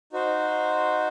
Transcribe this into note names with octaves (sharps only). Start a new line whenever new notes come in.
D#4 F#4 C5